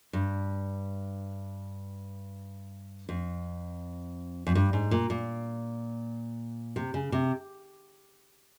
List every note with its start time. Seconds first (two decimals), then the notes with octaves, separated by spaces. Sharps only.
0.13 G2
3.09 F2
4.47 F2
4.55 G2
4.73 G#2
4.91 A#2
5.10 A#2
6.76 C3
6.94 C#3
7.12 C3